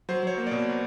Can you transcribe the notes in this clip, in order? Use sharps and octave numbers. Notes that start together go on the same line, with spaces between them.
F#3 C5
F#3 C#5
A#3
B2 D5